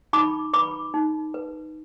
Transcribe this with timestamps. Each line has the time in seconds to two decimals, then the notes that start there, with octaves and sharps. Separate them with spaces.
0.13 D#4 B5 D6
0.53 B4 B5 D6
0.94 D#4
1.34 B4